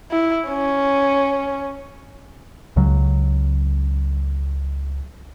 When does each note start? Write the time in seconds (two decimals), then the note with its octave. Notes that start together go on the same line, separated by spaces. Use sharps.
0.11 E4
0.49 C#4
2.76 C#2 C#3 F#3